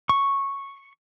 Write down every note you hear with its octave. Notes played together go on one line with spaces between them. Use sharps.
C#6